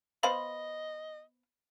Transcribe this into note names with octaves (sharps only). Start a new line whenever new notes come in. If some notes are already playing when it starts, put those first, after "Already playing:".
B3 C5 D#5 F5 B5